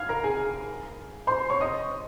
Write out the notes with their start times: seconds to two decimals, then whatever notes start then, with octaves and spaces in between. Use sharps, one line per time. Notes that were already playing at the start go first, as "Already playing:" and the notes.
Already playing: F5 F6 G#6
0.09 A#4 A#5
0.24 G#4 G#5
1.27 C5 C6
1.50 C#5 C#6
1.61 D#5 D#6